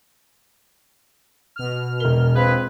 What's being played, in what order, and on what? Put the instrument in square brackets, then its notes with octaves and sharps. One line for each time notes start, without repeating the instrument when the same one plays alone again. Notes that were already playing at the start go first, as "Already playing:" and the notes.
[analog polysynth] B2 F6
[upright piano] E1 G7 [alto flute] A#4
[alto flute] C4 [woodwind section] F4 G#4 B4